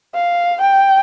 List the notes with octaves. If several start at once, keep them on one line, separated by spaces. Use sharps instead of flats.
F5
G5